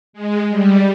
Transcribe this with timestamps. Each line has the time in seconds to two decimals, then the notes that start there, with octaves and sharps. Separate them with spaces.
0.13 G#3
0.48 G3